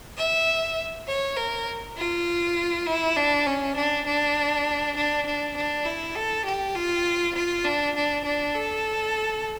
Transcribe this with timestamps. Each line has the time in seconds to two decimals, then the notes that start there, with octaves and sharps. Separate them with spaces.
0.17 E5
1.07 C#5
1.37 A#4
1.97 F4
2.87 E4
3.16 D4
3.46 C#4
3.76 D4
4.06 D4
4.96 D4
5.26 D4
5.56 D4
5.85 E4
6.15 A4
6.45 G4
6.75 F4
7.34 F4
7.65 D4
7.95 D4
8.24 D4
8.54 A4